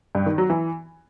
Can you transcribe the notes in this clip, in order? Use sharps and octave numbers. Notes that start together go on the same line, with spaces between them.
G2
D#3
F#3
E3